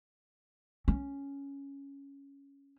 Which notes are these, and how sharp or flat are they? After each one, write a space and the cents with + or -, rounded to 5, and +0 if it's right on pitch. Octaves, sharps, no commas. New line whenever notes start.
C#4 +5